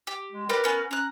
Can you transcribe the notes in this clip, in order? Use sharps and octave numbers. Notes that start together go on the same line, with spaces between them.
G4
G#3
D4 G4 A#4 B4
B3 C#4 B4
C#4 A#5 F#6